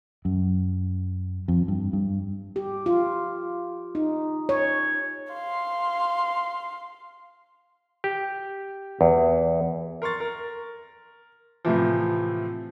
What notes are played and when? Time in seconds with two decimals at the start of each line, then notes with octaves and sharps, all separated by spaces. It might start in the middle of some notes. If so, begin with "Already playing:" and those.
0.25 F#2
1.48 F2
1.68 G2
1.93 G2
2.56 G4
2.86 F4
3.95 D#4
4.49 C#5
5.33 F5 C6
8.04 G4
9.01 E2
10.02 A#4 C6 C#6 A6
10.20 A#4
11.65 A2 C3 E3 F3